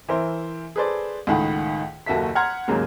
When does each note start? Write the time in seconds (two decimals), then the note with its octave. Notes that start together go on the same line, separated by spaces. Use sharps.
0.09 E3 E4 A#4 C5
0.76 G#4 A4 B4 C5 D5
1.27 C#2 A2 D#3 F#5 B5
2.06 F#1 D#2 F#4 A4 E5 B6
2.35 F#5 A#5 C6 F6 G#6
2.68 D#2 G#2 C#3 F#3 A#3